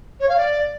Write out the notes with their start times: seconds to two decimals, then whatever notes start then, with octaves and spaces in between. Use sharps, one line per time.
0.20 C#5
0.28 F5
0.37 D5